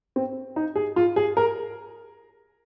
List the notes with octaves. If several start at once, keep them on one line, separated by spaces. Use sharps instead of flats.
C4
D#4
G#4
F4
G#4
A#4